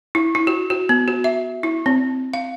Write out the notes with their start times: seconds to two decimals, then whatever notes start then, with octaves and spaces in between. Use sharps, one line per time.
0.15 E4
0.35 E4
0.47 F#4
0.70 F#4
0.89 B3
1.08 F#4
1.24 E5
1.63 E4
1.86 C4
2.34 F5